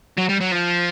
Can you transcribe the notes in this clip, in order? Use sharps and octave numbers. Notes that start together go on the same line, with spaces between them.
F#3
G3
F#3
F3